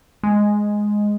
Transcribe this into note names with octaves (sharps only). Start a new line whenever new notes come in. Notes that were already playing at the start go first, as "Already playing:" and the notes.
G#3